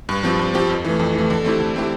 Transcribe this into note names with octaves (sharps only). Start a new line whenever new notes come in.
G2
F3 C4 G4
G2
F3 C4 G4
F2
E3 A3
F2
E3 A3
D3
A3 C4 E4 G4
D3
A3 C4 E4 G4